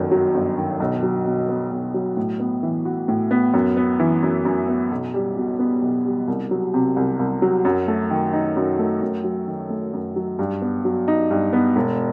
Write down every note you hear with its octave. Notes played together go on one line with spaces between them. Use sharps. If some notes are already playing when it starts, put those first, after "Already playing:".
Already playing: G1 F#2 D#3
F#3
G1
D#3
B1
F#3
B2
B3
B1
F#3
A2
B3
E3
F#4
A2
B3
F#2
B3
E3
F#2
F#2
B3
B1
G3
B2
B3
B1
G3
C2
F#3
C3
C2
C2
F#3
F#2
A3
D#3
D#4
F#2
A3
F#2
F#3
D#3
A3
F#2
F#3
G2
B3
F#3
D#4
G2
B3
E1